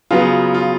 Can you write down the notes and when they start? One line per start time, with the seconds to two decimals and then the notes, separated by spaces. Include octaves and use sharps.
0.11 C#3 F#3 B3 F4
0.54 F4